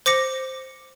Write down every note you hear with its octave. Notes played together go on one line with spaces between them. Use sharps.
C5 D6 A#6 C#7